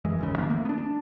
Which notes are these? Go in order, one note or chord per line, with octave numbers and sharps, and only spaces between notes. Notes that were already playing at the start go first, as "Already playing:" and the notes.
F#2 E3 G#3
G#1 D#2 C#3
D#3 F3 A#3
A3 A#3
B3 D4
D4